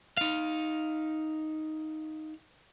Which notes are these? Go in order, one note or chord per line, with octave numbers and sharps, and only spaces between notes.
D#4 F5